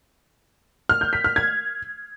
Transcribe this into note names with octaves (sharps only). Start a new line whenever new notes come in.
F6
G6
B6
F6
G#6